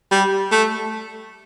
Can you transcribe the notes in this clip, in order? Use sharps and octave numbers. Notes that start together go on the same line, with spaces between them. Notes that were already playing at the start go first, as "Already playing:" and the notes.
G3
A3